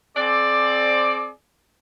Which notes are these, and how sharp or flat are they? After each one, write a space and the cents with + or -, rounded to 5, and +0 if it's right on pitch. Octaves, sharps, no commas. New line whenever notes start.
C4 +10 G#4 +45 D5 +10